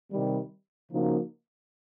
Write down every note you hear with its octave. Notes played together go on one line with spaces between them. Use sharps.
C3 D#3 G3
C#3 F3 A#3 D#4 F#4